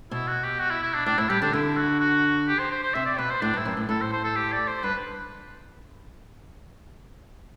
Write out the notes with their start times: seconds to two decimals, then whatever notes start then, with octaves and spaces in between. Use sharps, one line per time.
0.11 B2 E4
0.28 F#4
0.44 G4
0.60 F#4
0.71 E4
0.83 E4
0.94 D4
1.06 A2 D4
1.18 A2 E4
1.30 G3 G4
1.42 D3 D4
1.53 D3 E4
1.77 F#4
2.00 F#4
2.48 G4
2.59 C5
2.71 C5
2.83 C5
2.94 C3 E5
3.06 D5
3.18 B2 B4
3.30 C5
3.42 A2 D4
3.53 G2
3.57 E4
3.65 F#2
3.77 A2
3.89 A2 A4
4.01 C5
4.13 C5
4.24 A4
4.36 G4
4.52 D5
4.68 C5
4.83 G2 B4